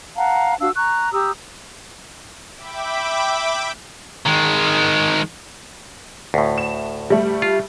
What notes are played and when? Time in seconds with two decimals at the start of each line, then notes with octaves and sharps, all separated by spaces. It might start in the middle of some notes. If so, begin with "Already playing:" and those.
0.17 F5 F#5 A5 A#5
0.61 D4 F#4 F5 E6
0.76 A#5 C#6 F#6
1.12 G4 A#5 D#6 E6
2.57 E5 G5 B5 D6
4.26 D#3 G#3
6.34 D2 A2
6.58 E7
7.10 G3 A3
7.42 F4